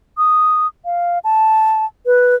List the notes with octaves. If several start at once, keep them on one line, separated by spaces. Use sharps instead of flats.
D#6
F5
A5
B4